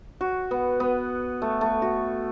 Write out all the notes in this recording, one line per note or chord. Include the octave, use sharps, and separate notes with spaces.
F#4
B3
B3
A3
A3
F#4